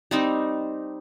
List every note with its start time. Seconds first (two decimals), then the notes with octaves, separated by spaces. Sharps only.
0.11 G3 C4 D#4